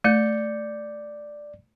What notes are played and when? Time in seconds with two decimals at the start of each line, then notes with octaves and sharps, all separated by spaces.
0.04 A3 D5 G6 C#7